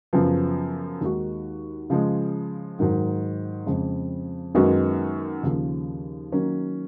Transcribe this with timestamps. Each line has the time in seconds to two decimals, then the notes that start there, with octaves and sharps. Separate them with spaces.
0.13 F#2 C#3 F3 B3
1.01 D#2 D#3 G#3 D#4 F#4
1.90 C#3 F3 G#3
2.79 G#2 D#3 F#3
3.67 F2 C#3 G#3
4.55 F#2 D#3 G#3 B3 F#4
5.43 D#2 C#3 F3
6.32 D#3 F#3 A#3 C#4